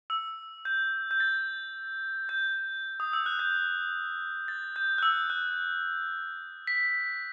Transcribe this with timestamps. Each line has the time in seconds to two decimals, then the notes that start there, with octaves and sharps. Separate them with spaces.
0.10 E6
0.65 G6
1.11 G6
1.20 A6
2.29 G6
3.00 D#6
3.13 E6
3.26 F#6
3.39 G6
4.48 A6
4.76 G6
4.98 F#6
5.03 E6
5.30 F#6
6.67 B6